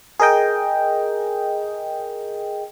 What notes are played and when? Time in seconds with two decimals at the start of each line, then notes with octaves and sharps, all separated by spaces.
0.19 G#4 A#4 D#5 G5